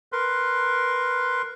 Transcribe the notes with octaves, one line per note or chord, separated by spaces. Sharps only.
A#4 B4 C6